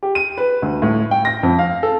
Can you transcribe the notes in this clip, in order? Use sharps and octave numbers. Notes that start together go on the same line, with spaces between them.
G4
D#7
B4
D2
A2
G5
A#6
F2
F5
A4